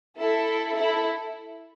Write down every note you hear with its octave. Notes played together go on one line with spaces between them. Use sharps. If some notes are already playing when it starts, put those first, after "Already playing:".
E4 A4
E4 A4